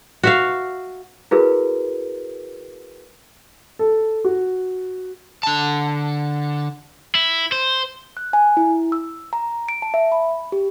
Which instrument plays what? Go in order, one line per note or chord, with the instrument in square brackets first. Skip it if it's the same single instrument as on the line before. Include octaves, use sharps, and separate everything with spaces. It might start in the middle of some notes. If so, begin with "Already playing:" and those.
[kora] F#4 E5 F5
[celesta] E4 F#4 G#4 A#4 B4
[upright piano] A4
F#4
[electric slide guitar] D3 A5
[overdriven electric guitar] E4
C5
[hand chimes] F#6
G#5
E4
E6
A#5
D7
A5
E5
B5
G4